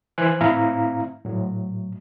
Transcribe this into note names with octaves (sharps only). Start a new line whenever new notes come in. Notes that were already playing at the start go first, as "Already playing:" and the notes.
E3 C5 G#5 F#6
A2 C4 E4 F5 A#5
A2 F#3